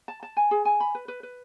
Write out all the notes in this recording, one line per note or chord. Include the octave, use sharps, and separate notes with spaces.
A5
A5
G#5
G#4
G#5
B5
B4
B4
B4